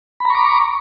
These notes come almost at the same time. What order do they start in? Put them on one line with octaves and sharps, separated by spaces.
B5 A#5 C#6 D6